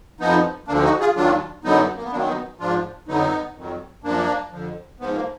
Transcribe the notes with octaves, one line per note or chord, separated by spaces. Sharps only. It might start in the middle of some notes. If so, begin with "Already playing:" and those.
F2 F3 B3 D#4
D2 D3 F3 A#3 D4
D#4 F#4
F4 G#4
D#2 D#3 F#3 D4 F4
F#2 D3 F#3 B3 D#4
A#3
B3
F#2 D#3 F#3 A#3 D4
B3 D#4
G#2 F3 D4 F4
F2 D3 F#3 B3 D#4
F2 D#3 F#3
F#2 F3 A#3 D4
F2 D3 F3
G#2 F3 B3
A#3